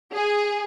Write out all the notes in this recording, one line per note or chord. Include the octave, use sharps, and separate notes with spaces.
G#4